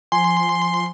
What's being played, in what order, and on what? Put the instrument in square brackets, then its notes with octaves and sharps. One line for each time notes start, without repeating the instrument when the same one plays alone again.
[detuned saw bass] F3 [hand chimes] G#5 [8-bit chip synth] C6